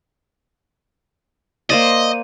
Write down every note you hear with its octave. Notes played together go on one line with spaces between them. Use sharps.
A#3 C5 D5 D#5